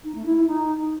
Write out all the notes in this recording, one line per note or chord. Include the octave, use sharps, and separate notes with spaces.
D#4
A3
E4
E4
D#4